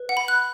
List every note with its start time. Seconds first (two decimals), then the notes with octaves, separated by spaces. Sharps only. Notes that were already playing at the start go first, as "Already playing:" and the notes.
Already playing: B4
0.09 F#5
0.17 B5
0.28 F#6